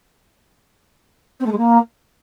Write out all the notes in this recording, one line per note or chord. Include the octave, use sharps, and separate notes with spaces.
C4
A3
G#3
A#3